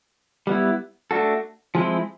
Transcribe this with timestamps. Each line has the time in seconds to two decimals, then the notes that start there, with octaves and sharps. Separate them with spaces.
0.47 G3 B3 E4
1.11 A3 D4 F#4 A4
1.75 F3 G#3 C4 E4